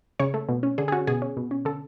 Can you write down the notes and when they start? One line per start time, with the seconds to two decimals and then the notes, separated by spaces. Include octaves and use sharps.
0.19 C#3 C#5
0.34 A3
0.49 B2
0.63 C#4
0.78 D3 G#4
0.88 G#4
0.92 C#4 F#4
1.07 B2 G#4
1.22 C#4
1.37 B2
1.51 C#4
1.65 D3 A4